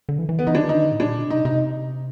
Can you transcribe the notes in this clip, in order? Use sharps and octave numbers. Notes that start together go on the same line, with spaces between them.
D3
E3
E3
D#3 B3
E3 D#4
D#3 D4
D3 D#4
A2
A#2 D4
B2
C3 D#4
C3 D#4